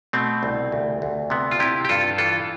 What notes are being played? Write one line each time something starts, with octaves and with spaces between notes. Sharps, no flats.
B2 A3 C4
C2
D2
D2
C3 B3
F4
C3 E4 G4
G4
G2 F4 A4
E3 F4 A4